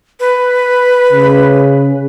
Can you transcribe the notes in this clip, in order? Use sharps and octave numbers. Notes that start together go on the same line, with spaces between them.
B4
C#3